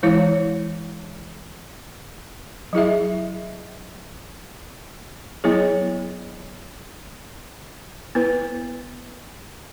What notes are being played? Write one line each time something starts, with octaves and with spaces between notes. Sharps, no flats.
E3 G#3 E4 C#5
F#3 E4 G#4 E5
F#3 B3 E4 G#4 C#5
B3 E4 B4